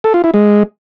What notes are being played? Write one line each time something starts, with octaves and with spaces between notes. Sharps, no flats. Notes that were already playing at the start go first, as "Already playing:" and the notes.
A4
F4
E4
G#3